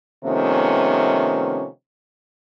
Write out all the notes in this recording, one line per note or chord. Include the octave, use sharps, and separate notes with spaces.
C3 D#3 F3 A3 B3 C#4